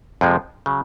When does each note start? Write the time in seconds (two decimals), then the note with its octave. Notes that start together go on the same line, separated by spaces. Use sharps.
0.21 F2 C3 F3 G#3
0.66 C#3 F#3